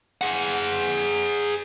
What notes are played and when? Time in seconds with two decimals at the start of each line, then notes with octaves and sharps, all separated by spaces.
0.21 G#4 F#5